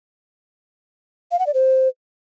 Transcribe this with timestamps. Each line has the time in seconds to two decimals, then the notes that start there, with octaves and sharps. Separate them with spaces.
1.32 F5
1.39 F#5
1.47 D5
1.54 C5